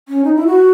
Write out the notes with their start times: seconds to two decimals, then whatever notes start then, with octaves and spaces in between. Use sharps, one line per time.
0.09 C#4
0.24 D#4
0.36 E4
0.47 F#4